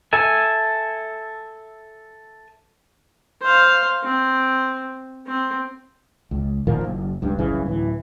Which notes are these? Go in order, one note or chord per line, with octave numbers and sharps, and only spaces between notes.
A4 E5 G#5
C5 F5
C4
C4
C#2
A#2 D#3 F3 A#3
F#1
C#2 G2
F#1 C2 C#3 E3
D1 E3